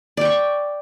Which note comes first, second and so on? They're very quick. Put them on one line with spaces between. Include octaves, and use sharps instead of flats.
D5 G5 C#6